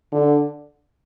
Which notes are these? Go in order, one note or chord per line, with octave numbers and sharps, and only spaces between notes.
D3